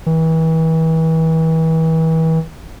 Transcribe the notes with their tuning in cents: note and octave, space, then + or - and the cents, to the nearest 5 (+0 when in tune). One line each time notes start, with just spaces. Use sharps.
E3 -35